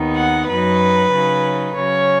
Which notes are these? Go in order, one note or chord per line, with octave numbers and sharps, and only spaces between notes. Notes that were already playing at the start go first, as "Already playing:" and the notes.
Already playing: D#2 D#3 B3 D#4
F#5
F#2 F#3 D#4 B4
C#3 F#3 D#4
C#3 F#3 C#4 C#5